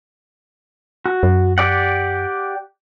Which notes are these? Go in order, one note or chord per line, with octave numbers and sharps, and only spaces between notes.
F#4
F#2
G4 D5 F#5